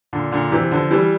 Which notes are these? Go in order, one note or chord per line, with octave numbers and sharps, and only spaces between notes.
A#2 D3
A#2 D3
C3 E3
D3 F3
E3 G3